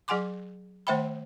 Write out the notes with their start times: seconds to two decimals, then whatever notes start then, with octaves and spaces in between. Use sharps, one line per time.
0.08 F#3 G#4 F#5 G#5 C6 D6
0.87 D#3 A3 C5 E5 G5 B5